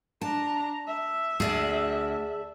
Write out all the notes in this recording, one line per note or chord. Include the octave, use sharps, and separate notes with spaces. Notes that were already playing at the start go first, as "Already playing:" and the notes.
D4 A5 A#5
E5
D2 G#4 D5 A5